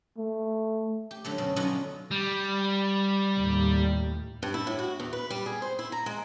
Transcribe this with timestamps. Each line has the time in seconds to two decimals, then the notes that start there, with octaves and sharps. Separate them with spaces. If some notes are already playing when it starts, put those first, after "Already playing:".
0.18 A3
1.11 G4
1.25 D3 F#3 A3
1.38 F#2 B2
1.56 B2 D3 F#3 C#4 D#4 F4
2.11 G3
3.39 D#2 A2
4.43 G2
4.54 E4
4.67 A2
4.79 F#4
5.00 E2
5.13 B4
5.30 G3
5.46 G#4
5.62 C5
5.79 E4
5.92 A#5
6.06 G#3